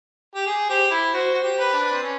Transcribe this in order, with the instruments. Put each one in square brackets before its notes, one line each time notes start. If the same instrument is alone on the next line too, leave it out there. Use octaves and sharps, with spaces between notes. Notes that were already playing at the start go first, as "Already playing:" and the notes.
[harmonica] G4
G#4
[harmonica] G4 [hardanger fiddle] C5
[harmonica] E4
[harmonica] F#4 [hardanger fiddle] C5
[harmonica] F#4
G4
[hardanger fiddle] B4
[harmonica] D4
C4
C#4